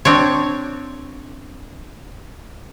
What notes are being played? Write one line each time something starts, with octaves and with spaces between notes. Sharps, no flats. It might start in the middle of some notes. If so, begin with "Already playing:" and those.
C4 D4 C#5